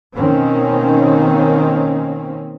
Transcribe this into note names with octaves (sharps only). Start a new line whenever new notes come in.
B2 D#3 A#3 C4 C#4